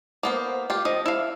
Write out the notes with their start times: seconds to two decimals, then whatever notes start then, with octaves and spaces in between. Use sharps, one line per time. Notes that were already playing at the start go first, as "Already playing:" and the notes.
0.23 A#3 B3 C5
0.70 F4 G4
0.85 F3 D#5
1.06 E4 F5